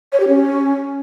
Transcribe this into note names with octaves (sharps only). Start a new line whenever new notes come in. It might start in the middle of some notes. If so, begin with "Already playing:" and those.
C#5
G4
C#4